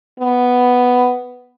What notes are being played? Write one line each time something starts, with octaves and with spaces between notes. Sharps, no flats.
B3